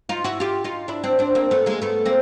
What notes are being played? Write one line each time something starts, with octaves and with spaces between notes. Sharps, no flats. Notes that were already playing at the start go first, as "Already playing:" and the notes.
D#4 F4
E4 F#4
F4 G4
D#4 F4
D4 E4
C4 D4
C4 D4
A#3 C4
A3 B3
G#3 A#3
A3 B3
A#3 C4